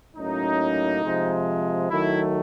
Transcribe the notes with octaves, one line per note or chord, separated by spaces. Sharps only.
A2 F#3 A#3 C#4 D#4
C3 F3 G#3
D#3 F#3 A3 E4